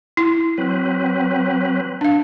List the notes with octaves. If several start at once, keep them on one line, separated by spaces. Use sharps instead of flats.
E4
F#3 C4 B4
D4 F5